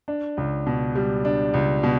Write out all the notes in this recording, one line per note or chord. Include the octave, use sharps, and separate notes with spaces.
D4
C#2
B2
G3
D4
C#2
B2